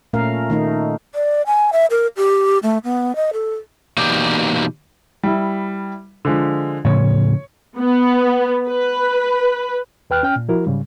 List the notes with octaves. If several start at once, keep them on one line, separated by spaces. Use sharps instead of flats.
A#2 A3 C#4 A#4 F5
D#3 A3 D#4
D5
G#5
E5
A#4
G4
A3
B3
D#5
A4
B2 E3 A#3 D#4 G4 D5
G3 E4
D3 F3 G#3
A2 C#3 F3 C#5
B3
B4
D#2 B4 G5 F6 F#6
C#4 G5 F6
A#2
F3 E4 F#4 A#4
G#2 C#3 G3